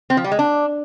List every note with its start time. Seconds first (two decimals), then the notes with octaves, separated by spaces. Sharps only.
0.10 C4
0.17 F3
0.24 G3
0.32 G#3
0.39 D4